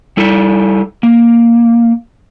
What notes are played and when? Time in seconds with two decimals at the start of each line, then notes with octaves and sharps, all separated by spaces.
0.17 G3 E4 A4
1.03 A#3